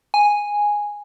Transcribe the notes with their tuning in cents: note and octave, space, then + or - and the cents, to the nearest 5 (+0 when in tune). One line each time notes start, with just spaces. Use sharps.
G#5 -5